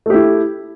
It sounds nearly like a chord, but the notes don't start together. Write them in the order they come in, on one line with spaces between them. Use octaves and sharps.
A3 G4 E4